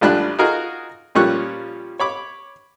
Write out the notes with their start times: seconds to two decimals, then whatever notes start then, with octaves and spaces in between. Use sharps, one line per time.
0.01 A1 F3 G3 D4 B5 F#6
0.39 D#4 F4 F#4 G#4 A#4
1.15 A#2 F3 G3 C#4 C#6 F#6
1.99 C#5 B5 D6